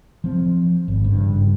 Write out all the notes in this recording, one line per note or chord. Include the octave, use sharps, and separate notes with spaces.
F3 C4
G#1
G2 C#3